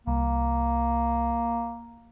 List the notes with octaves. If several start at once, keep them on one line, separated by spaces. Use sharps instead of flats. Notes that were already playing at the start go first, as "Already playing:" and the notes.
C2 A#3